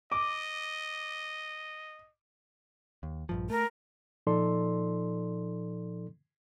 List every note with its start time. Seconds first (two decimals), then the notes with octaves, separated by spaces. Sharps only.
0.12 D#5 D6
3.03 D#2
3.29 A#1 G2 F3
3.50 A3 A#4
4.27 A#2 F3 D#4 A4 D5 C6